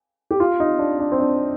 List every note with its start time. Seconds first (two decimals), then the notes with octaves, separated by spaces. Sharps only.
0.31 G4
0.40 F4
0.60 D#4
0.79 D4
1.00 D4
1.12 C4
1.19 D4